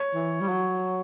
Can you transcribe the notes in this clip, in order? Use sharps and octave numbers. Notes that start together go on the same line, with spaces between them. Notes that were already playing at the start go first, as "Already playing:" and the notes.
Already playing: C#5
E3
G3
F#3